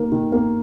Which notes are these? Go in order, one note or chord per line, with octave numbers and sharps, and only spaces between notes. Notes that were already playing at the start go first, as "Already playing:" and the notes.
Already playing: D#3 A#3
D#3
A#3